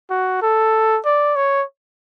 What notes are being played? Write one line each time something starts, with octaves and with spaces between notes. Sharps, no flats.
F#4
A4
D5
C#5